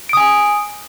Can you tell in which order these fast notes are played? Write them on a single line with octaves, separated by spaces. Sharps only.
D7 D#6 G#5